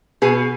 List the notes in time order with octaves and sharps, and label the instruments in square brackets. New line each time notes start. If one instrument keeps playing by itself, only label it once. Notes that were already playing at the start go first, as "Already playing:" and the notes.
[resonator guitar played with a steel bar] B2 G#4 B4